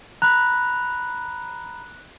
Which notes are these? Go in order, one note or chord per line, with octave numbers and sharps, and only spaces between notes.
A#5 B5 F#6